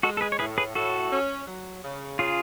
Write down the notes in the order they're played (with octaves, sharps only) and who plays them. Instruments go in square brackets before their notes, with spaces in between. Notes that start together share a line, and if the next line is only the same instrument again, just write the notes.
[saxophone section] G#3 [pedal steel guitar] F#4 A4
[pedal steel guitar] A4
G#4 B4
C#5
[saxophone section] A2 [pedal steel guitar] G#4 B4
[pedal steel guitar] G#4 B4
[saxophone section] A2 [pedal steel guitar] F#4 A4
[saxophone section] C#4
F#3
C#3
[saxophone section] C#3 [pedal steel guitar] F4 G#4